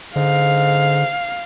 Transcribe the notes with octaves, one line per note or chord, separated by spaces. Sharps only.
G#2 D3 F5